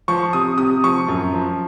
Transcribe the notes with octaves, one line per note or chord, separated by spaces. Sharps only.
F3 C#6
C3 D#6
C3 D#6
F3 C#6
F#2
F3